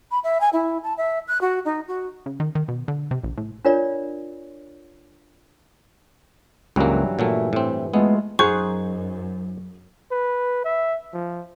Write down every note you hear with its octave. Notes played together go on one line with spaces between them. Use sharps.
B5
E5
G#5
E4
A5
E5
F#6
F#4
D#4
F#4
C#3
D#3
D#3
B2
D3
C3
A#1
A2
D4 F4 A#4 C#5 D5
C#2 G2 E3 F#3 A#3
A#2 E3 F#3 A3
A2 C4
G#3 A3 B3 F4
F#2 D#4 G#4 C5 F#5 C#6
B4
E5
F3